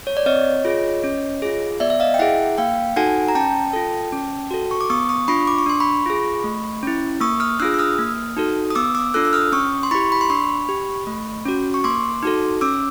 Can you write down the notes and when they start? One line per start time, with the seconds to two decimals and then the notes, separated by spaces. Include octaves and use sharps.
0.07 C#5
0.17 D5
0.26 C4 C#5 D#5
0.65 F4 G#4
1.04 C#4
1.42 F4 G#4
1.80 B3 D5 E5
1.90 E5
2.00 D#5 F5
2.14 G5
2.19 E4 G#4 E5 F#5
2.58 A#3 F5 G5
2.96 D#4 F#4 A4 F#5 G#5
3.28 A#5
3.35 C#4 G5 A5
3.73 F4 A4
4.12 C#4
4.51 F#4 A4
4.71 C#6
4.81 D6
4.90 B3 C#6 D#6
5.09 C#6 D#6
5.28 D4 F4 B5 C#6
5.47 D6
5.58 C#6
5.66 D4 C6
5.80 B5 C#6
6.06 F4 G#4
6.44 A3
6.83 C#4 E4
7.21 A#3 C#6 D#6
7.40 D#6 F6
7.60 D4 F4 G#4 E6 F#6
7.74 E6
7.79 D#6 F6
7.99 A#3
8.37 D#4 F#4 A4
8.70 D#6
8.75 B3 D6 E6
8.95 D6 E6
9.14 D4 F4 A4 E6 F#6
9.25 E6
9.33 D#6 F6
9.52 C#4 C#6 D#6
9.83 C6
9.91 E4 G4 B5 C#6
10.12 B5
10.21 C6
10.30 D4 B5 C#6
10.69 G4
11.07 A3
11.46 C#4 F#4
11.74 C#6
11.84 A#3 C6 D6
12.23 D#4 F#4 A4
12.61 C#4 D6 E6